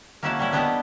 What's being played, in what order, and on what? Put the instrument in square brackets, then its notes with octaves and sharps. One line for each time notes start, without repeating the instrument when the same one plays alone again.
[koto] A#3 C#4 E4 F#4 E5 A5
G3 C#4 E4
B3 D4 E4 G4 D#5